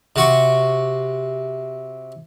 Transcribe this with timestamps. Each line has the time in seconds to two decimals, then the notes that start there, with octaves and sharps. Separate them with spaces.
0.16 C3 F#4 C#6